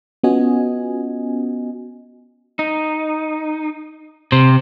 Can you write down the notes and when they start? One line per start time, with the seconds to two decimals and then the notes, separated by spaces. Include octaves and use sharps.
0.23 B3 C#4 F4 F#4 D#5 G#5
2.59 D#4
4.32 C3 C5